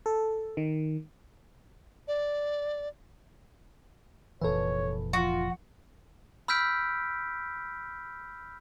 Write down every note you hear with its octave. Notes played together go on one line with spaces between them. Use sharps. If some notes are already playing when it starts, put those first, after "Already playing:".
A4
D#3
D5
F1 A#2 E3 A4 B4 C#5
F3 F4 F#4
B5 E6 F6 G6 B6 D7